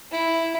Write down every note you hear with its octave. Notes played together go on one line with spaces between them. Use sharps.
E4